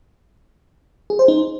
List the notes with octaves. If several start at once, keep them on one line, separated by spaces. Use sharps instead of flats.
G#4
C5
D#4